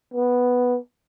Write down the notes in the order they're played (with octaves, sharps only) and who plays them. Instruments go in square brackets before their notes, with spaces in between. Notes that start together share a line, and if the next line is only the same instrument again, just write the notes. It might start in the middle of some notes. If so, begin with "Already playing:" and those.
[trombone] B3